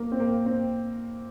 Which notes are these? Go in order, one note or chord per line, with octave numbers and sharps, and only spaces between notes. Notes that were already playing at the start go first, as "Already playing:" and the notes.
Already playing: A#3
C4
A#3
C4